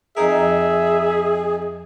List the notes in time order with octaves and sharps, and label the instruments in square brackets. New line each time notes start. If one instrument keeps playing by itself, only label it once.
[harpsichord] F2 D#4 A#4 [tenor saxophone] G#4 [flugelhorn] E5